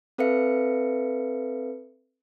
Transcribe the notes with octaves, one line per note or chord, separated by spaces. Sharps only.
C4 A4 B4 E5 F5 C#7